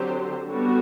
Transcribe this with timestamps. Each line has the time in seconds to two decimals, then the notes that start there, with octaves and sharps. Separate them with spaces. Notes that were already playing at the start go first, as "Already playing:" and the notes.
Already playing: D3 F#3 C4 G4 C5
0.45 D3 G3 B3 F#4